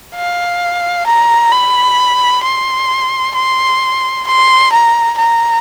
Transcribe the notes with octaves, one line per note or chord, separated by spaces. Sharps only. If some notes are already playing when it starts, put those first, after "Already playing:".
F5
A#5
B5
C6
C6
C6
A#5
A#5